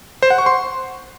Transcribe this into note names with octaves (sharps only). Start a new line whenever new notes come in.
C5
F#5
C#6
C6